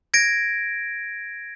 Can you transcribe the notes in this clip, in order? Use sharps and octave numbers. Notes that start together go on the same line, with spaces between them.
G#6 A#6 D7